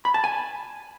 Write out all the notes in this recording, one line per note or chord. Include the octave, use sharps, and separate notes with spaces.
B5
A5
G#5